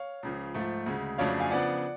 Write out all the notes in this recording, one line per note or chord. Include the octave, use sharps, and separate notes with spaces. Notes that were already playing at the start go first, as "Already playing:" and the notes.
Already playing: C#5 F5
C#2 C#3 F3
G#2 F3 A3
D2 C#3 G#3
F2 C#3 F#3 A3 D4 C#5 F5
F5 G#5
C#3 F3 B3 D4 D5 F#5